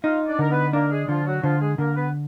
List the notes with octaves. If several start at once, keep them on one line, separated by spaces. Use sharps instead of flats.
D#4 F4 F5
D4 D5
D3 A#4
B3 B4
A#3 D4 A#4
G#3 G#4
D3 F3 F4
F#3 F#4
D3 F3 F4
G#3 G#4
D3 A#3 A#4
B3 B4